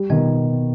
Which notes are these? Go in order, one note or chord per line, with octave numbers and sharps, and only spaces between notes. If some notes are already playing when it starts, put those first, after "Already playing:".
Already playing: G3
B2 D#3 B3